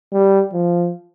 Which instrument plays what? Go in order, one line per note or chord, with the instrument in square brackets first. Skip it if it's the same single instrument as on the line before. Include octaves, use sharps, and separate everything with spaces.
[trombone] G3
F3